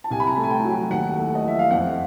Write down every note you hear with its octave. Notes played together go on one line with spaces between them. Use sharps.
A5
C2 G#5
B5
A#5
A3 A5
G#5
G5
F#3
D#2 F#5
A3
D#5
F3 E5
F5
F2 F#5